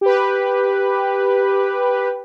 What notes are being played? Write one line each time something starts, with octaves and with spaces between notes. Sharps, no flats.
G4 B4